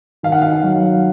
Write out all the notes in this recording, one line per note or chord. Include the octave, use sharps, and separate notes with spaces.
D#3 F5
F#5
F5
F#3